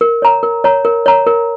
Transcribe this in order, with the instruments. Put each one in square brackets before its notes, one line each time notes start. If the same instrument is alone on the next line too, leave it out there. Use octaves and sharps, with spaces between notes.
[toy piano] A#4
C#5 A#5
A#4
C#5 A#5
A#4
C#5 A#5
A#4